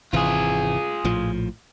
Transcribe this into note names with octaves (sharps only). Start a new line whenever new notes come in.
G#1 C3 E3 F4 G#4
A#1 A2 F3